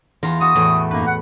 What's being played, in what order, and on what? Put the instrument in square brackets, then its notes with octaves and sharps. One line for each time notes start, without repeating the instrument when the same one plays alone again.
[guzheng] E2 F4 A#5
[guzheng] F#4 [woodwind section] D#6
[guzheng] E2 A2 A3
[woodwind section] F#2 A#3 D#4 [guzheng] B4
[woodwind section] F#5